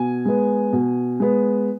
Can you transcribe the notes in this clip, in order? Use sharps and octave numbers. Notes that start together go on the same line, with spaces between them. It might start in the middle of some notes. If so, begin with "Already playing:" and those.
Already playing: B2 G#5
G#3 B3
B2
G#3 B3